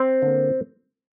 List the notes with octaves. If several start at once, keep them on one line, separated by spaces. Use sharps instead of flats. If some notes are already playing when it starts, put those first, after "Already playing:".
Already playing: C4
D3 A#3